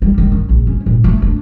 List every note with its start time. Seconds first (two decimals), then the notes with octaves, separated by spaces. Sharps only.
0.02 G3
0.18 D#3
0.32 C#4
0.49 A#1
0.67 C#4
0.86 A#2
1.04 A3
1.22 D4